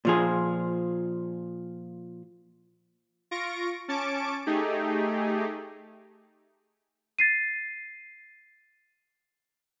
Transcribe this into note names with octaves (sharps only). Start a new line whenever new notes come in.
A#2 F3 G#4
F4 C#6 A#6 D7
C#4 A5 C#6 D6 D7
A3 D#4 G4 G#4
A6 C7 D#7